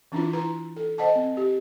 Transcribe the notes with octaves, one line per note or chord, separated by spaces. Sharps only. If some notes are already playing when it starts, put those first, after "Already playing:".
E3 C#4 D4 E4 F4
E4 B4 A#5
A4
C5 D#5 F#5 A5
C4
G4